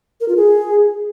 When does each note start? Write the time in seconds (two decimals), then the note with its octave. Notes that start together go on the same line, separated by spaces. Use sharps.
0.21 A#4
0.29 F4
0.37 G#4